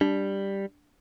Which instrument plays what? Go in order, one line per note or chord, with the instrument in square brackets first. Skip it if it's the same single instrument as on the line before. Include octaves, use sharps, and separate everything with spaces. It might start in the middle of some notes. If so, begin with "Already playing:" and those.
[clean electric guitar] G3 [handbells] D4